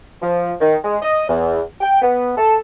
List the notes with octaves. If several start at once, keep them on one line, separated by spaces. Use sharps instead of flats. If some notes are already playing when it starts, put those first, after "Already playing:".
F3
D#3
G#3
D#5
E2
G5
B3
A4